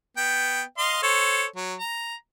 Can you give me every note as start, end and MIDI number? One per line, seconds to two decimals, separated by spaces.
0.17 0.62 59
0.17 0.62 79
0.78 1.02 75
0.78 1.02 77
0.78 1.02 84
1.03 1.45 69
1.03 1.45 72
1.03 1.45 73
1.56 1.74 54
1.80 2.15 82